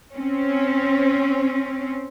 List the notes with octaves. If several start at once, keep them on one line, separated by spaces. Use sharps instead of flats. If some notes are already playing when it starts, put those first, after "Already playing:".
C4 C#4